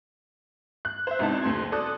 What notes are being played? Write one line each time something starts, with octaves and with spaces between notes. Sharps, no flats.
F#6
C5 E5
G#1 C3 B3 D#4 E4 A5
F#1 D2 C6 G#6
A4 D5 D#6 F#6